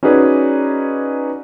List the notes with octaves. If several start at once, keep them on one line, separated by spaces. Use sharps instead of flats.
C#4 D#4 F#4 G#4 B4 D5